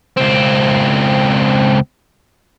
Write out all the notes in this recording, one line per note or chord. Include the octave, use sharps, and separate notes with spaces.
C#2 C4